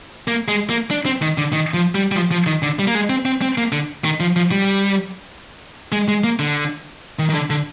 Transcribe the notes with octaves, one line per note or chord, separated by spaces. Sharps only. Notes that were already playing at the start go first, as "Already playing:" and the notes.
A#3
G#3
A#3
D4
C4
D#3
D3
D#3
F3
G3
G3
F3
F3
D#3
D3
G3
A#3
G#3
C4
C4
C4
A#3
D3
D#3
F3
F3
G3
G#3
G#3
A#3
D3
D#3
D#3
D3
D3